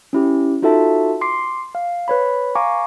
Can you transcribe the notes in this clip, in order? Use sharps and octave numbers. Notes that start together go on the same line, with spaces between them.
C#4 E4 G4
D#4 F4 F#4 A4 E5 A5
C6 D6 C7
F5
B4 C#5 B5
F5 G#5 A#5 C#6 D6